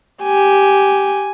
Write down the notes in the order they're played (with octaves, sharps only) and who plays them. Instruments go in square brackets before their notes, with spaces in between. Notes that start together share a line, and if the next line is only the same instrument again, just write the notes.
[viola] G4 G#5